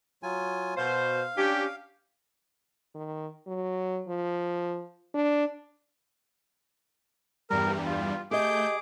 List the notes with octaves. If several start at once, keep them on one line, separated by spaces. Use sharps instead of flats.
F#3 F4 G#5
B2 C5 F5
C#4 D4 G4
D#3
F#3
F3
D4
E2 G2 G3 A#4
F4
A3 G4 G#4 D#5 D6 G6